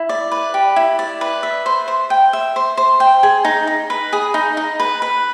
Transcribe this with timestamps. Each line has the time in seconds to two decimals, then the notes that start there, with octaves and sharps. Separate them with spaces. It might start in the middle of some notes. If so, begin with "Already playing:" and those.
Already playing: E4
0.09 D5
0.32 B4
0.54 G4
0.76 E4
0.99 D5
1.21 B4
1.43 E5
1.66 C5
1.88 C5
2.10 G5
2.33 E5
2.56 C5
2.77 C5
3.00 G5
3.23 G#4
3.45 D#4
3.67 D#4
3.90 B4
4.13 G#4
4.34 D#4
4.57 D#4
4.80 B4
5.02 B4